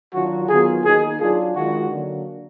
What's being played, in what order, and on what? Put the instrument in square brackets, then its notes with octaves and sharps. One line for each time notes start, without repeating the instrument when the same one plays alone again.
[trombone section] D#3 F#3 D4 F4 [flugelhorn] F#4
[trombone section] D#3 F#3 B3 F4 [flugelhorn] G#4
[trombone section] D#3 A#3 D#4 [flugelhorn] G#4
[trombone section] F#3 D4 F4 [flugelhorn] G#4
[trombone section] D#3 G#3 D4 F4 [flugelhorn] F#4
[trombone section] D3 F#3 A#3 D4